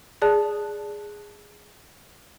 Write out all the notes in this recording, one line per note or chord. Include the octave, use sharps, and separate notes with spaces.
G#4 D5 A5 F#6